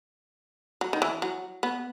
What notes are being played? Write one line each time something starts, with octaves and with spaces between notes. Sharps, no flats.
F#3
D#3
E3
F#3
B3